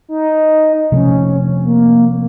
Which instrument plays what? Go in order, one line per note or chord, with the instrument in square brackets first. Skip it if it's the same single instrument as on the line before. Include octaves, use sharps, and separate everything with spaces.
[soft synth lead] D#4
[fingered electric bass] C3 F3 A3 [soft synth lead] C#4
[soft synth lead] A#3